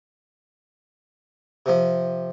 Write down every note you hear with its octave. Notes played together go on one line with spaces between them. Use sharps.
C3 F3